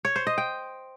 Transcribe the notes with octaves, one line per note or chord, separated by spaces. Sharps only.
C#5
C5
D#5
G5